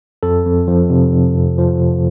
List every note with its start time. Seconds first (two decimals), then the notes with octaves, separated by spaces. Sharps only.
0.23 F2 A4
0.45 F2
0.68 F3
0.90 C3
1.12 F2
1.35 F2
1.58 F3
1.80 C3